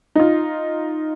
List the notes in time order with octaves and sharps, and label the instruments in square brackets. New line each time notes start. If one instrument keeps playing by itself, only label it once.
[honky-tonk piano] D#4 F4